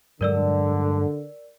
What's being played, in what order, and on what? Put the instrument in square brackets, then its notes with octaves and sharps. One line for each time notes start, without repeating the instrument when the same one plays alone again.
[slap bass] G2 F#3 G#3 [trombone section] D3 [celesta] A#4 D5 E6